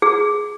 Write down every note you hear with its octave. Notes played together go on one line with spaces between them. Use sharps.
G#4